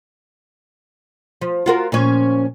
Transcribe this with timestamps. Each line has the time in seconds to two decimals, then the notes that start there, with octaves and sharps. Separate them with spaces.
1.41 F3
1.66 F4 F#4 A#4
1.92 A#2 F3 C#4